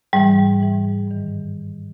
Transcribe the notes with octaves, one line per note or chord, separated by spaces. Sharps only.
G#2 E3 G3
G#2 E3
G2 D#3